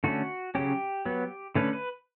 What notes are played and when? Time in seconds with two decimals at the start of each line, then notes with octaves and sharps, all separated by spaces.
0.04 D3 A3 C#4 F#4
0.55 C#3 F#3 C#4 G4
1.05 F#3 B3
1.55 D3 A3 C#4 B4
1.73 B4